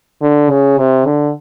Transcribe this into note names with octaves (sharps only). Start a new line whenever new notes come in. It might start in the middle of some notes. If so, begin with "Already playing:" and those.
D3
C#3
C3
D3